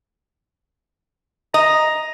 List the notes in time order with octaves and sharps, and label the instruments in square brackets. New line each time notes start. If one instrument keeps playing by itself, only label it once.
[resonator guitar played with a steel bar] D#5 [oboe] A#5